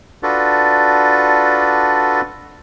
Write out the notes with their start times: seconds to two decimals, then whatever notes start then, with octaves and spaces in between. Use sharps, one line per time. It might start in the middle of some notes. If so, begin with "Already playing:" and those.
0.23 D4 F4 F#4 A4 B4 D5